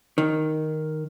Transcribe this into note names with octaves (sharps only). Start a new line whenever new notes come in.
D#3